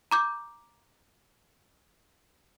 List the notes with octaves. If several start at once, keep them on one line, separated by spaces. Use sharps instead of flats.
A#5 D6 G6